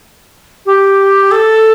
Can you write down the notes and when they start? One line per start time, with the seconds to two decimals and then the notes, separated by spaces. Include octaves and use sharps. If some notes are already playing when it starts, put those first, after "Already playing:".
0.66 G4
1.31 A4